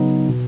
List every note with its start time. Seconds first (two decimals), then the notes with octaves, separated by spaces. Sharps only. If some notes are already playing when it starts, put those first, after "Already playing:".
Already playing: C#3 F#3 B3 D#4
0.29 B2